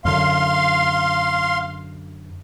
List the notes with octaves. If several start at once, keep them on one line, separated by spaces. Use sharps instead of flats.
F#2 D3 F5 C6